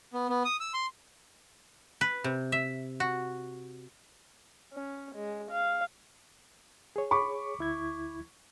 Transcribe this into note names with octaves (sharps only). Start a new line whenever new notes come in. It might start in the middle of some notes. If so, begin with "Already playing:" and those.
B3
B3
D#6
E6
C6
B4
C3
E5
F#4
C#4
G#3
F5
G#4 C#5
B5 C#6 D6
D2 E4 G#6